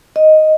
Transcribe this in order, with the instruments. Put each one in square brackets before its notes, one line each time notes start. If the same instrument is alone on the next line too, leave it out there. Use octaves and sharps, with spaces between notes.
[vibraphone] D#5